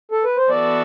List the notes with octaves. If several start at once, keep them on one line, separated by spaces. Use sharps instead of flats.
A4
B4
C5
E3 B3 F#4 A4 D5